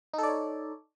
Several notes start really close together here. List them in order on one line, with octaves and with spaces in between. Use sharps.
D#4 A4 D5 C#5